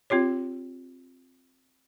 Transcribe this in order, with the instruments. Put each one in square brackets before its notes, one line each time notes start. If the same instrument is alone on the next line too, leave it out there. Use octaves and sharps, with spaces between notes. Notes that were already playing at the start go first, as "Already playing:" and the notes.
[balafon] C4 F4 G4 C#5